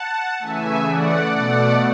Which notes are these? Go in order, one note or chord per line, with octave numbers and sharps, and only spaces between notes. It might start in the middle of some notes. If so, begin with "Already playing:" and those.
Already playing: F#5 A5
C#3 E3 A3 E5 G#5
D5 F#5
B2 A3 D5 F#5